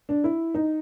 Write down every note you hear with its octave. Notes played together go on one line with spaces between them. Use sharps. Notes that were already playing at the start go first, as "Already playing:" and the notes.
D4
E4
D#4